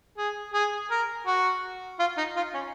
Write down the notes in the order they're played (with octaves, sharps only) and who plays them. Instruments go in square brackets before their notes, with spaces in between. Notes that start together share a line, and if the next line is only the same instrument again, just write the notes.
[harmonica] G#4
G#4
A#4
F#4
F4
D#4
F4
C#4